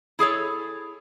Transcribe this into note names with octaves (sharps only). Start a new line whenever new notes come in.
E4 G#4 A4 C#5